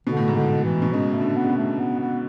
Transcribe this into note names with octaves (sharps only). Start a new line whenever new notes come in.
B2 D3
A2
G#2
A2 D3
E3
B2
C#3 G#3
A3
D3
B3
C#3
B2
A3
B3
B3